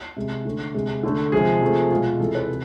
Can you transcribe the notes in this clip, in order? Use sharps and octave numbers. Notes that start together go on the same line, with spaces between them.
C3 G#3
D3 A3
C3 G#3
D3 A3
C3 F3 G#3 G#4
C3 F3 A3
B2 G#3 F4
C3 E3 G#3 A4
B4
C3